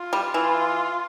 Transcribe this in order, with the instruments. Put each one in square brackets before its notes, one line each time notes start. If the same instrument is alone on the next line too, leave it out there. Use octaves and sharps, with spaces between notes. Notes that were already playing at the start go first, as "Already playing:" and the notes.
Already playing: [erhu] F4
[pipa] G3
E3